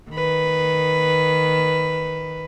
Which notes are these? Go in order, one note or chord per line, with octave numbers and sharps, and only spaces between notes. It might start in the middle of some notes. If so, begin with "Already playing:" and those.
D#3 B4